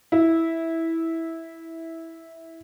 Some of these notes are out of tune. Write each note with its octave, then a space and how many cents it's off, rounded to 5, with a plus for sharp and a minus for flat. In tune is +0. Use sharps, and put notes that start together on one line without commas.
E4 -10